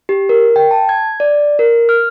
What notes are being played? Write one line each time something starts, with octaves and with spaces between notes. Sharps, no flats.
G4
A#4
G5
A5
G#6
D5
A#4
F6